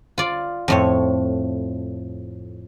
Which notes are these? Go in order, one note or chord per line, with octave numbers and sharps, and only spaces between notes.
F4 D5
F2 A2 C#5